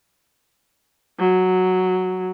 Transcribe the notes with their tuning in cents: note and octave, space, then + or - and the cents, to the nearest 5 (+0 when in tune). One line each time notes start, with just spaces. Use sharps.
F#3 -5